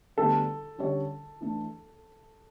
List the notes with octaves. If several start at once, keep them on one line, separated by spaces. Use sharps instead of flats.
D2 D3 G3 B3 D4 A4
D3 G3 C#4 G4 C#5
E3 A3 D4